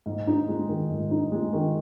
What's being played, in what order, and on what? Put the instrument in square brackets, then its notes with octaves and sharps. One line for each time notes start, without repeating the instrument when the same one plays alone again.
[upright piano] G#2
D#4
G#3
D#3
G#2
D#4
G#3
D#3